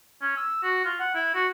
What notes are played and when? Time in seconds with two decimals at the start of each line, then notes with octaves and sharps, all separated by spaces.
0.22 C#4
0.37 E6
0.63 F#4
0.85 F4
0.99 F#5
1.15 E4
1.35 F#4